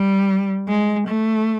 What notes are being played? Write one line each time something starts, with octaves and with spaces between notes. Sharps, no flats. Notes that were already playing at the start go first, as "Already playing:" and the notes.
Already playing: G3
G#3
A3